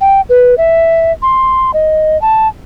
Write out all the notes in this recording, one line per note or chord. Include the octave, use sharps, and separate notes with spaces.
G5
B4
E5
C6
D#5
A5